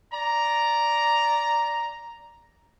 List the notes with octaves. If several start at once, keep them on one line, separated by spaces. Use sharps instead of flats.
D5 A#5